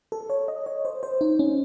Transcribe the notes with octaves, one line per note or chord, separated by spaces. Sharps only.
A4
C#5
D#5
C#5
C5
C5
D#4
C#4